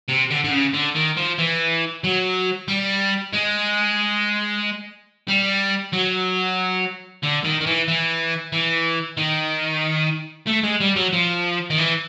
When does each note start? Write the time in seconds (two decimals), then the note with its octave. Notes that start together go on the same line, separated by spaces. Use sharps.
0.08 C3
0.30 D3
0.44 D3
0.51 C#3
0.74 D3
0.95 D#3
1.17 F3
1.39 E3
2.04 F#3
2.68 G3
3.33 G#3
5.28 G3
5.93 F#3
7.23 D3
7.44 D#3
7.60 D#3
7.66 E3
7.88 E3
8.52 E3
9.17 D#3
10.47 A3
10.63 G#3
10.80 G3
10.96 F#3
11.13 F3
11.70 D#3
11.78 E3